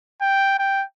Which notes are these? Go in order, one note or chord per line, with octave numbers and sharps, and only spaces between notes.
G5
G5